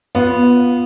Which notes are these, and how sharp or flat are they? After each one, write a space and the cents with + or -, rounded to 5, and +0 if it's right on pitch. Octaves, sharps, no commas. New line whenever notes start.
B3 -10 F4 +0